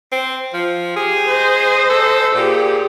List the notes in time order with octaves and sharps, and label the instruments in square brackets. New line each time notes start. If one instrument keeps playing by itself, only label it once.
[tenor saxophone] C4
F3
[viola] G4 [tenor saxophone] G#4
[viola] C5 D#5
[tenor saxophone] A4
[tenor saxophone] A#2 [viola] G4 G#4